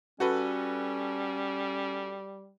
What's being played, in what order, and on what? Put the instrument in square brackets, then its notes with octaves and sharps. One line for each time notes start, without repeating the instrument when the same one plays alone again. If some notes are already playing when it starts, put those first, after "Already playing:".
[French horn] G3 [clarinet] C#4 [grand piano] F#4 A4 B4